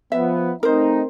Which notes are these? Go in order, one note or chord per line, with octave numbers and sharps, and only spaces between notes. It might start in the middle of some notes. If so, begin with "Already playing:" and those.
F3 B3 E5
A3 C4 D#4 A#4 C5